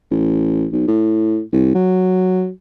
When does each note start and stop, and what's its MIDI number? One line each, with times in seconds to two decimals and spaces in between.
0.11 0.66 33
0.73 0.83 35
0.88 1.41 45
1.53 1.71 36
1.75 2.49 54